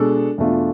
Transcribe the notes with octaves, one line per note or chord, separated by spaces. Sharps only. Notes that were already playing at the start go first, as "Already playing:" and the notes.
Already playing: B2 G#3 D4 A4
E2 B2 A3 D4 F4